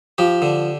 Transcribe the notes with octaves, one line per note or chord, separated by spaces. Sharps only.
F3 G4
D3